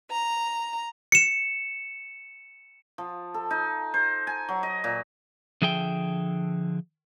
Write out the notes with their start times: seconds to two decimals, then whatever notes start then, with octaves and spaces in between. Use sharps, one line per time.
0.12 A#5
1.12 C#7 E7
2.98 F3
3.34 A4
3.51 D#4
3.94 C5
4.27 G#5
4.49 F#3
4.63 D#5
4.84 A#2
5.62 D3 F3 G#4 E5 G5